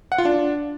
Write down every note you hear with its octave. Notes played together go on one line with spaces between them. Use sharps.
F#5
F4
D4